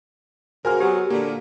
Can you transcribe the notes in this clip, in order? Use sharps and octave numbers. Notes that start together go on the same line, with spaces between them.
C#3 A#3 F#4 G#4 A#4 C5 G#5 F6
F#3 B3 G4 G#5
A#2 D3 A#3